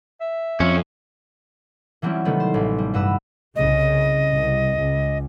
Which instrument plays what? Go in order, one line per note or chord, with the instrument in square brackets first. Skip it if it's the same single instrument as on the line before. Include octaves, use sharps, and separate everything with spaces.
[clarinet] E5
[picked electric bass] F2 [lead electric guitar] C#4
[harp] E3 F#3 G3 C4 C#4 E4
C3 D#3 G3 A3 B3
C5
A1
G3
G2 F#4 B4 E6
[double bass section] C2 C#3 [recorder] D#5
[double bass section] C2
C#2